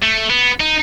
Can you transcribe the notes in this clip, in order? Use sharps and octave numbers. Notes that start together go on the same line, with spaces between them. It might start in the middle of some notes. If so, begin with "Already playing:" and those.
A3
B3
D#4